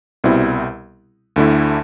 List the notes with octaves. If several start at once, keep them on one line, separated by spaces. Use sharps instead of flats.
C2 B2 G3 C4 E4
D2 D3 A3 E4